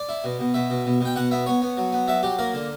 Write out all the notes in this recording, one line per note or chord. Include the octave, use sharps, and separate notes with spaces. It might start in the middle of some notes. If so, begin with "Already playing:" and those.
Already playing: D5
E4
B2
B2
B2 E5
B2
B2
B2 G5
B2 F#5
B3 E5
B3 C#5
B3
F#3
B3
F#3 E5
F#3 G4
A#3 A#4
D3